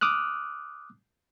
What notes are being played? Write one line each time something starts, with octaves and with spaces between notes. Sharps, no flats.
D6 D#6 F6 F#6